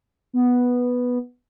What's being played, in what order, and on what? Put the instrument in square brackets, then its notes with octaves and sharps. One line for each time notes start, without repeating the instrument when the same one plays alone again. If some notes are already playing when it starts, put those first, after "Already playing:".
[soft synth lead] B3